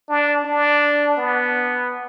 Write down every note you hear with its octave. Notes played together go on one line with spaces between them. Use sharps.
D4
D4
B3